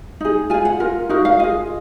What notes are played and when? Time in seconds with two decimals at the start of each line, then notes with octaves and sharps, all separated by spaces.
0.20 D#4 G#4
0.50 F4 G#4 G#5
0.65 F#5
0.80 F4 A#4
1.09 D#4 F#4 A#4 F5
1.25 F5
1.39 F4 G#4 D#5